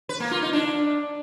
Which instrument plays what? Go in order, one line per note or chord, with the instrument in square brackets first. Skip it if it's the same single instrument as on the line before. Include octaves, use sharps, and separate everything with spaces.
[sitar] B4
A#3
F4
D#4
D4